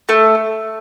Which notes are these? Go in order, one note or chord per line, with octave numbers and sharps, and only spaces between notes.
A3